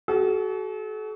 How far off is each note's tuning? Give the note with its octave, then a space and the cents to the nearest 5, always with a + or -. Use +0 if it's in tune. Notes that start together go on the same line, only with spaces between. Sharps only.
F#4 +30 A4 -40